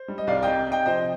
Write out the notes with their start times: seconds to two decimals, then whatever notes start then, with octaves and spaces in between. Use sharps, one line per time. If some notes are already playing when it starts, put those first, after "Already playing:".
Already playing: C5
0.08 G3
0.18 D#5
0.27 C2 D5 F5
0.43 C3 D#5 G5
0.67 C3 D#5 G5
0.86 F3 C5 D#5